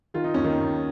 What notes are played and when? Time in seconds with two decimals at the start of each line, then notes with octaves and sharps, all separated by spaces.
0.14 D#3 F4
0.24 D#4
0.34 D#2 C#4
0.44 D#3 D#4
0.58 D#2